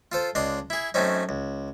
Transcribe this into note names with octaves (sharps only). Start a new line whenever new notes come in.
F4 A4 C5
C#2 D4 D#5 C6
E4 G#4
F#2 A3 C4 C#4 D#4
C#2